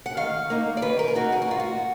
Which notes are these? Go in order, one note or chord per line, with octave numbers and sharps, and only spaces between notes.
F#5
D#3 F5
A#3 D#4
D5
D#3 B4
A#4
G#4
A#3 D#4 F#4
G#4
F#4
A#2 F4
F#4